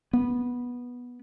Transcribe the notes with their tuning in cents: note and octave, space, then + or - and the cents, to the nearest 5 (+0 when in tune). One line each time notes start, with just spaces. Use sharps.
B3 -10